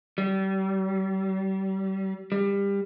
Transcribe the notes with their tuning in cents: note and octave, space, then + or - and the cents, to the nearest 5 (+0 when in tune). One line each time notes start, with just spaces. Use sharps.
G3 -30
G3 +25